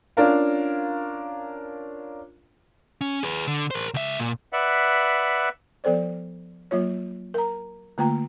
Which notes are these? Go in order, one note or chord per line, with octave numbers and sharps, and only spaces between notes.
C#4 D4 F4 A#4 F5
C#4
G#4 B4
D3
A#4 C5
C#2 E5
A#2
B4 D5 E5 F#5
F3 B3 A4 C5 D5
F#3 A#3 F4 C#5
A#4 A#5
D3 A3 A#3 F4 G5 A#5